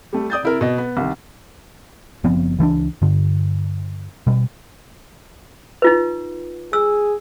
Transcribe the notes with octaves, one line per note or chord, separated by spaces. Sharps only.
G3 A3
D5 D#6 G6 A6
C3 E4 A#4
B2 D#5
B3
C2 D#3
F#1 F3 B3 C4
C#2 E3 A3 D4
G2 D3
B2 G3
D#4 F4 B4
G#4 E6